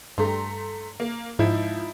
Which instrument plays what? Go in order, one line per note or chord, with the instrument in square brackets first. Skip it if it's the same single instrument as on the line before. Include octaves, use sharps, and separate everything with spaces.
[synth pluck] G2 [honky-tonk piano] A3 A#5 C6
[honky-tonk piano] A#3
[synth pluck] G#2 [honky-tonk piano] F3 [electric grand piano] D#4 E4 E5